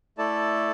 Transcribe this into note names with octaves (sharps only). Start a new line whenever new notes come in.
A3 E4 A4 D5 A5